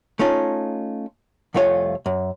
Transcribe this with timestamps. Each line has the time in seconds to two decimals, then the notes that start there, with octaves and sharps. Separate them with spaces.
0.19 A3 C#4 D#4 F4
1.54 C2 F2 A3 F4 C#5 G#5
2.06 F#2